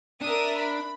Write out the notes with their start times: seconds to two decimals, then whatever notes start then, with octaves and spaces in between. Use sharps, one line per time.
0.21 D4 A#4 E5 D#6
0.59 B5